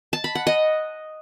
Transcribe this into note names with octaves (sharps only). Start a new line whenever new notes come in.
A5
B5
F#5
D#5